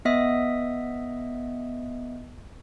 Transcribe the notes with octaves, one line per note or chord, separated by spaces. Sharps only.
B3 D#5 E5 D#6